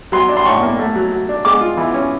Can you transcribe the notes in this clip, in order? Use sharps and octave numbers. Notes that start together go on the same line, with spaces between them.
F#3 C6
D4
C6
A2 C#6
A#3
A3
F#3
F#3
D4
G#3 D6
F4
E3
C#4